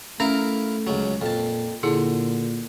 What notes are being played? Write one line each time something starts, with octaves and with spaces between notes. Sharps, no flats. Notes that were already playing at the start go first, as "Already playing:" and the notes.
A3 C#4 E4 A#4 F5
C#2 F#3
F2 A#2 A5
A#2 D3 E4 G#4